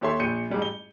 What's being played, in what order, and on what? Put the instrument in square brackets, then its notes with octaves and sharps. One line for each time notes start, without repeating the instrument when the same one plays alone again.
[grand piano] D#2 G4 A4 C#5 E5 C6
A#1 G6 C#7 D#7
A1 G#2 G3 G#3
G7